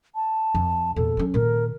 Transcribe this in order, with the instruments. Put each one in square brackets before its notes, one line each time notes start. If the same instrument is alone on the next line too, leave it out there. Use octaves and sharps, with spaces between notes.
[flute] A5
[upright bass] F2
[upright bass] E2 A#2 [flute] A4
[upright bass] F#3 C#4
[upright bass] A#2 D#3 [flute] A#4